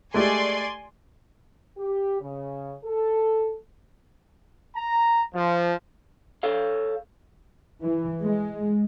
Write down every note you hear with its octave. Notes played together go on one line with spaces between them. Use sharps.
G#3 A3 G4 D5 G#5 C6
G4
C#3
A4
A#5
F3
A4 C#5 F5
E3
G#3